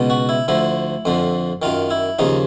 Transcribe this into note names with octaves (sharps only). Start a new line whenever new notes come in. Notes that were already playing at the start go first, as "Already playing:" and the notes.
Already playing: C#2 B2
F#4
E4
D2 D3 F3 E4
F2 D3 F3
F#2 D#3 F4
E4
D#2 C#3 F3 D#4